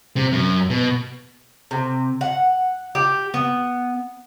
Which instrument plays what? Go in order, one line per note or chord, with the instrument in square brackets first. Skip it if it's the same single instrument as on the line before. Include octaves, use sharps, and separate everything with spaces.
[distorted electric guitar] C3
F#2
B2
[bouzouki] C3
F#5
G4
B3